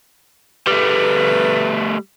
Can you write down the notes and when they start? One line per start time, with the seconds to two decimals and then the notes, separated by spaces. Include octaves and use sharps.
0.67 G3 A3 B4